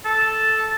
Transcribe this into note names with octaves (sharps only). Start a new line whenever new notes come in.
A4